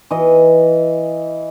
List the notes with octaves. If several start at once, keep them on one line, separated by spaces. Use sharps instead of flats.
E3 D#5